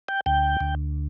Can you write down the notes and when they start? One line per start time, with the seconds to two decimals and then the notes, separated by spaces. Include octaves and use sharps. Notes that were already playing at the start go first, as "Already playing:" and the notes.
0.08 G5
0.26 D2 G5
0.61 D2